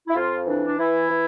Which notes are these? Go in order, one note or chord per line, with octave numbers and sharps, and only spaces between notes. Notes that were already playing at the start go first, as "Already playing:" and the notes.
E4
F2 F4
E3 D4
D4
E3 E4
E3